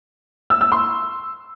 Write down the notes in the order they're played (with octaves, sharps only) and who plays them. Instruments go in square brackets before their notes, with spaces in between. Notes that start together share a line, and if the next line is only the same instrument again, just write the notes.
[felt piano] E6
E6
C6